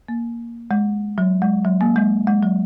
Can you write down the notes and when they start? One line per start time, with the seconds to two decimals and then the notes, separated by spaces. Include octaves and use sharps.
0.08 A#3
0.71 G#3
1.18 F#3
1.42 G#3
1.65 F#3
1.81 A#3
1.96 G#3
2.27 G#3
2.43 F#3